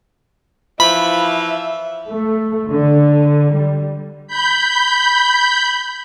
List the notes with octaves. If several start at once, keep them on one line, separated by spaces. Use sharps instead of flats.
E3 F3 E5 B5 B6
A3
D3
G3
B5 G6